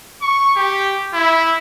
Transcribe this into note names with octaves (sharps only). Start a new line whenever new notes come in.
C#6
G4
E4